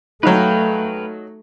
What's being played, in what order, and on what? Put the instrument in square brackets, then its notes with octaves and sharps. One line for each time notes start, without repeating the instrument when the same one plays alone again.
[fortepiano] F#3 D#4 [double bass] A3 [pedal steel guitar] B4 F5 G5